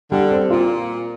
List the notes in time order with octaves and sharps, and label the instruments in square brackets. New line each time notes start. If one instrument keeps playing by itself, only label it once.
[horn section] D3 [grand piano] G3
[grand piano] C4
[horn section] A#2 [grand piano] F4